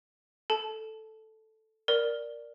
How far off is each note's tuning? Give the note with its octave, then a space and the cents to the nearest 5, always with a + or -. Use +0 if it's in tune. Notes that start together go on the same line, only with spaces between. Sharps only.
A4 +0 A5 -15
A#4 +5 D5 +0